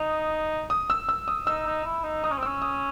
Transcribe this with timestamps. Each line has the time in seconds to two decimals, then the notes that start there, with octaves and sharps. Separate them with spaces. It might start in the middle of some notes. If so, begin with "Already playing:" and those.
Already playing: D#4 D#6
0.70 D#6
0.90 E6
1.09 E6
1.28 D#6
1.47 D#4 E6
1.66 D#4
1.85 E4
2.04 D#4
2.24 D#4 D#6
2.30 C#4
2.38 C4
2.43 C#4 E6
2.62 D#6